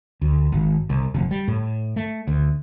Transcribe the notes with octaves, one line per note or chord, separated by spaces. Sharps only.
D2
G#1
C2
F1
G3
A2
A3
D2